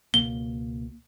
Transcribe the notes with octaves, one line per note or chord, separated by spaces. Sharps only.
C#2 B2 A#3 G7